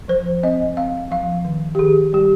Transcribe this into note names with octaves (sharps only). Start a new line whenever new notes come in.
F3 C5
C4 D#5
C4 F5
F3 F5
D#3
G4
D#3 G#4
G3 G4